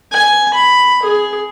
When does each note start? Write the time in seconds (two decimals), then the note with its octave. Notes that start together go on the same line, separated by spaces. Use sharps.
0.12 G#5
0.54 B5
1.02 G#4